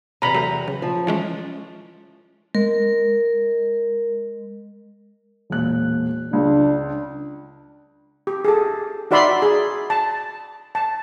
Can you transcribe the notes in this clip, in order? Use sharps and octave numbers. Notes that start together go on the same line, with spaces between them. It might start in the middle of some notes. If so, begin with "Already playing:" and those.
E2 C3 A#5 B5
F#3 A3
C#3
F3
E3 G#3 C#4
G#3 A#4
E1 A#2 F#6
C#2 D4
G4
G#4 A4
D#4 F#4 D5 E5 B5 C6
G#4
A5
A5